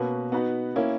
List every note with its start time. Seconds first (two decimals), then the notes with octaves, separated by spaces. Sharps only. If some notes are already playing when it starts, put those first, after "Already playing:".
Already playing: B2 A#3 C#4 F#4 B4
0.32 B3 D#4 F#4 B4
0.76 A#3 C#4 E4